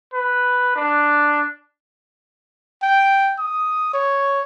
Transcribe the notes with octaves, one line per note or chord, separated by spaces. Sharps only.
B4
D4
G5
D#6
C#5